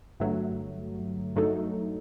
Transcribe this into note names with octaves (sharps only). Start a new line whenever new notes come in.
G1 G2 F#3 A3
G2 F#3 A3 D#4 A4